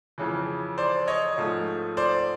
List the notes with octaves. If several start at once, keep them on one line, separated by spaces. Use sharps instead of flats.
F2 C#3 E3
C5 D5
C#5 D#5
G#2 F3 A3
C5 D5